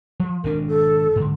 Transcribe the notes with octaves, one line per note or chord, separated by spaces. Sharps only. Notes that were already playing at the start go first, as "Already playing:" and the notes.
F3
G#1 B2 D4 A#4
A4
G#2 D3